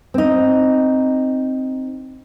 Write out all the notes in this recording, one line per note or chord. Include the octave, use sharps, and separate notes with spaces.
C4 D#4